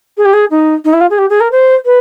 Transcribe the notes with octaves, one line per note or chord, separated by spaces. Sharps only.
G#4
G4
G#4
D#4
D#4
E4
F4
G#4
G4
G#4
A#4
C5
B4